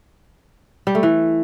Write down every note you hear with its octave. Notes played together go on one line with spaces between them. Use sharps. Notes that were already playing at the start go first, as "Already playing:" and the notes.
G3
A3
E3